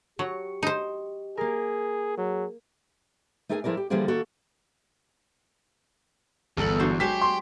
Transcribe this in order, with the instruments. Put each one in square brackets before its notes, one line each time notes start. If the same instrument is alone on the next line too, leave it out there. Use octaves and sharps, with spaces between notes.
[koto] F#3 [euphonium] G4 [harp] C#6
[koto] D#4 C5
[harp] A#3 A#4 [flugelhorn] G#4
[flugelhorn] F#3 [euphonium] G#4
[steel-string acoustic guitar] A3 D#4 G#4 A#4 G5 G#5
F3 E4 G#4 A#4 D5
G4
D3 E3 F3 G3 A#3 G#4
D#3 A#3 F#4 A4
[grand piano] G1 A4 F#7 [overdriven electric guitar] E2
[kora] D3 F#3 C5
[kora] F#3 G#3 C5 [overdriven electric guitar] G4 [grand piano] B6
[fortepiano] C6